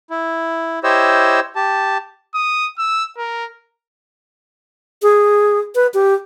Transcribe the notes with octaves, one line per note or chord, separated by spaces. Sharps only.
E4
E4 G4 C5 C#5 D#5 E6
G4 A5
D#6
E6
A#4
G#4
B4
G4